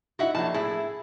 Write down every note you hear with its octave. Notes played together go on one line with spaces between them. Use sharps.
D#4 E4 F#4 E5 F#5
A#1 F#3 A5
A2 E4 G#4